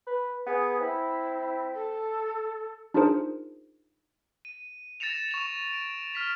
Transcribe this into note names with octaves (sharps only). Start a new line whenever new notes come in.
B4
B3 G#4
C4 E4
A4
D4 D#4 F4 G#4 A#4 C5
D#7
A6 A#6 C#7 E7 F7
C#6 F7
D7
F6 B6 F7